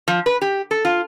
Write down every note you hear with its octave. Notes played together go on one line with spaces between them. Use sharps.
F3
B4
G4
A4
F4